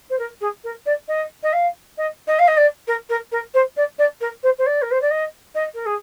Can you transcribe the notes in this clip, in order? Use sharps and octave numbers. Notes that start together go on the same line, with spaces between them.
C5
A#4
G#4
A#4
D5
D#5
D#5
F5
D#5
D#5
F5
D#5
D5
A#4
A#4
A#4
C5
D5
D5
A#4
C5
C5
D5
A#4
C5
D5
D#5
D#5
A#4
G#4